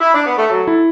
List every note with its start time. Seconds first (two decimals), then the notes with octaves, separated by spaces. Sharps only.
0.00 E4
0.13 D4
0.26 B3
0.37 A3
0.50 F#3 A4
0.67 E4